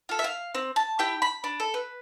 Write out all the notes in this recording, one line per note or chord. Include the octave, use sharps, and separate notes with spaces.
F4 A4
E5
F5
C4
A5
E4 G4 G5
B5
D4
A4
B4